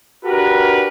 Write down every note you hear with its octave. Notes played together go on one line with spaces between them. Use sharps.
D4 F#4 G4 A#4 B4